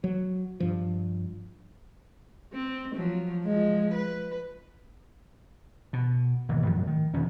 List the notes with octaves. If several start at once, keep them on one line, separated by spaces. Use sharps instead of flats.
F#3
G2 F3
C4
F3 F#3
F3 G#3
B4
B2
G#1 D#2 B2 E3
F#2 A2 F3 F#3
D#3
E1 E2 F3 C#4